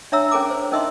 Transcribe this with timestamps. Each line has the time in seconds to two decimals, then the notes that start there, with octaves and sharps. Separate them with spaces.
0.12 D4 C#5 E5 A#5 E6
0.31 C#4 G#4 A#4 G#5 A#5 D6
0.50 C5
0.72 C#4 D#4 A#4 D#5 E5 C6